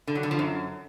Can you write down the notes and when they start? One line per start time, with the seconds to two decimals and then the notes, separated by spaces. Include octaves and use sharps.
0.07 D3
0.15 F#3
0.23 D3
0.31 F3
0.39 F#2